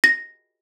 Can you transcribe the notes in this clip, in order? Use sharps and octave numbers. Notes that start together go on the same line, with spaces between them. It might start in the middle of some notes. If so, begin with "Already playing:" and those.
A#6